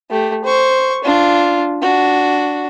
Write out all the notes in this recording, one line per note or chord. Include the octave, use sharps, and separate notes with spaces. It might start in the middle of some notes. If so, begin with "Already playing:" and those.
A3 G4
C5 C#6
D4 F4
D4 F#4